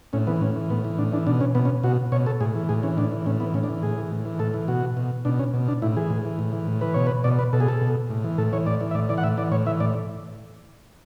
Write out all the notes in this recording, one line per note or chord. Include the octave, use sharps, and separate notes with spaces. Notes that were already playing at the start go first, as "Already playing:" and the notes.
A2 C#4
E3 B3
A2 C#4
E3
A2 B3
E3
A2 D4
E3 D4
B2 D4
C#4
B2 B3
C#4
B2 F#4
B2 C#5
A4
A2 G#4
E3
A2 G#4
E3 C#4
A2 D4
E3
A2 C#4
E3 B3
A2 C#4
D4
E3
A2 G#4
E3
A2
E3
A2 A4
E3
B2 F#4
B2
B2 D4
C#4
B2
D4
A2 E4
E3 G#4
A2
E3
A2
E3
A2
E3 B4
B2 C#5
B4
B2 D5
B4
B2 A4
G#4
A4
B2
A2
E3
A2 A4
E3 C#5
A2 D5
E3
E5
A2 D5
E3 D5
F#5
A2 E5
E3 D5
A2 C#5
E3 E5
A2 D5